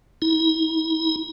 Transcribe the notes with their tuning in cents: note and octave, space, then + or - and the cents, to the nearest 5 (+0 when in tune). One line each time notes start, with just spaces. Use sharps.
E4 -45